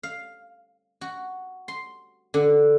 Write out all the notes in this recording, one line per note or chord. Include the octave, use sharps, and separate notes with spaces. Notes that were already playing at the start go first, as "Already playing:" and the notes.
F5
F#4
C6
D3